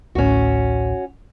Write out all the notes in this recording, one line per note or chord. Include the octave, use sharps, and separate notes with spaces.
A1 D2 A2 C#4 F#4